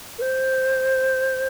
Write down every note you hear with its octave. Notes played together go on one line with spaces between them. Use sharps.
A#4
C5